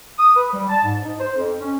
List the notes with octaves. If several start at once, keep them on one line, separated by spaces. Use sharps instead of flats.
D#6
B4
G3
A5
G#2
D#4
C5
F2
C#4